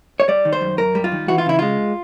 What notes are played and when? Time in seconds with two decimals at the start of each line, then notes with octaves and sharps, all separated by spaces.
0.20 C#5
0.28 G3 D5
0.45 D#3
0.53 C5
0.61 F#2
0.78 F#2 A#4
0.95 G3
1.04 F4
1.12 D#3
1.28 E3 F#4
1.38 F4
1.46 C#3 E4
1.59 G#3 F4